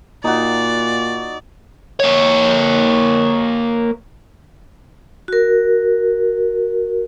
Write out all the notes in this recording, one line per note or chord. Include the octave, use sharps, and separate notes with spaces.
A#2 D#4 F#4 D5
A#3 C#5
F#4 A#4